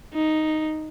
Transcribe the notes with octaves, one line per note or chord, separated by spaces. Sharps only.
D#4